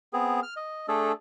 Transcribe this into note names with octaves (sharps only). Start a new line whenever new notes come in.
B3 C4 G#4
F6
D#5
A3 D4 G#4 A4